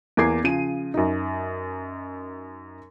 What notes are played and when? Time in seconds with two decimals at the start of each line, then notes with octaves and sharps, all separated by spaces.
0.17 E2 A#3 D6 G#6 C7
0.43 C#3 F3 D#7
0.94 F#2 D#4